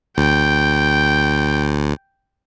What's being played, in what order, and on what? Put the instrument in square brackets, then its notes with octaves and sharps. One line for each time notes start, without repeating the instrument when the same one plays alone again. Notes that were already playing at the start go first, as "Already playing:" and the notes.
[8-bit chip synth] D2 [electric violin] G5